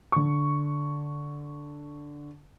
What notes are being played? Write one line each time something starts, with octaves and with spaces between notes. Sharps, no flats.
D3 C#6